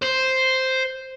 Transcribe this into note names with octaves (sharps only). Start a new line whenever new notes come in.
C5